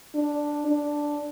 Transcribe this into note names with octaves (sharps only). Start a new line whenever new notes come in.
D4
D4